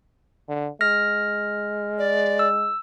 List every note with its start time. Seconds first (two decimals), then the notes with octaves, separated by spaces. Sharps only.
0.49 D3
0.81 G#3 F6 A#6
1.99 D5
2.39 E6